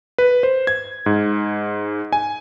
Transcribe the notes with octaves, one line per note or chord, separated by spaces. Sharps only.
B4
C5
G#6
G#2
G#5